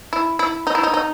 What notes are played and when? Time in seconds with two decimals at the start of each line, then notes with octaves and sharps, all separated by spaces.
0.13 E4
0.39 E4
0.67 D#4
0.75 E4
0.83 D#4
0.94 D#4